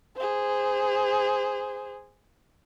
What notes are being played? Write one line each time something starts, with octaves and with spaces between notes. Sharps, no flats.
G#4 C5